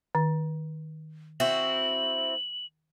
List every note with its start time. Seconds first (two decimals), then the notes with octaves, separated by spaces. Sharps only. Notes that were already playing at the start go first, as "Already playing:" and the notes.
0.15 D#3
1.40 C4 E4 F#4 F#7